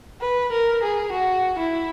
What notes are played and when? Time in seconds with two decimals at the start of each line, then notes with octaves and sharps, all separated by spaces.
0.21 B4
0.52 A#4
0.83 G#4
1.12 F#4
1.59 E4